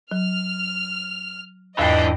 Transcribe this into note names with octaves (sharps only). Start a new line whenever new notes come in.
F#3 F6
E2 G#2 E3 D4 D#5 G5